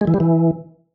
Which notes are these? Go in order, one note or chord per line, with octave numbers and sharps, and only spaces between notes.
G#3
E3
G3
E3